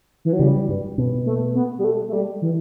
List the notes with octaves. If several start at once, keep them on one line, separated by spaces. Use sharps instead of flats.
E3
F#3
C#3 G3
G2
B2
A3
B3
G3
A3
A3
G3
E3